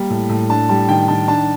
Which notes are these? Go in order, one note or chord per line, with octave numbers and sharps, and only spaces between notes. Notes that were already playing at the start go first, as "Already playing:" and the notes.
Already playing: G3 A#3
A2
A2
D4 A5
G3 A5
D#3 G5
D#3 A5
D4 A5